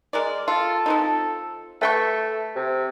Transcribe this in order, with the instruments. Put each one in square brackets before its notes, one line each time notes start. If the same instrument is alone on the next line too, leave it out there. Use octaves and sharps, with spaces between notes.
[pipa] G#3 A#4 D5
[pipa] F4 [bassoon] A4
[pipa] F3 C4 D#4
[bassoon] A3 [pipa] B4 G5 C#6
[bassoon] C3